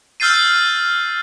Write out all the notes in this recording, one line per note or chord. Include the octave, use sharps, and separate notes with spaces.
E6 F6 G6 A6 C7 D#7